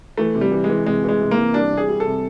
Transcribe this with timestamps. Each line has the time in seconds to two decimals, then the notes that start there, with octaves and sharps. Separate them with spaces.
0.18 E3 A3
0.35 C3
0.41 G3
0.52 E3
0.64 G#3
0.69 E3
0.86 C3 G#3
1.04 E3 G#3
1.20 C3
1.31 A#3
1.37 E3
1.54 G3 D4
1.72 C3
1.77 G#4
1.89 G3
2.00 A4
2.06 C3